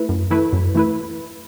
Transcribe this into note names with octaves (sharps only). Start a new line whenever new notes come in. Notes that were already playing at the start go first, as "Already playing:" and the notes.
Already playing: A3 E4 B4
F#2
E3 A3 E4 B4
F#2
E3 A3 E4 B4